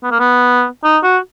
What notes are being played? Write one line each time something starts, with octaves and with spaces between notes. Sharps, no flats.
B3
A#3
B3
D#4
F#4